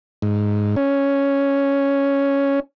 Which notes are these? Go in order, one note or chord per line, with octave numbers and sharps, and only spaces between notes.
G#2
C#4